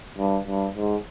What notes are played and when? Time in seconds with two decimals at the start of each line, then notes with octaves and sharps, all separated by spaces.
0.18 G2
0.47 G2
0.76 G#2